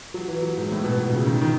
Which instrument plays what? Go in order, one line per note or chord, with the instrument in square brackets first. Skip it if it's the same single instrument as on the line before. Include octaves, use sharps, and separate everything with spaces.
[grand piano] F#3
E3
F#3
G#2
A2
B2
B2
C#3
D#3
D#3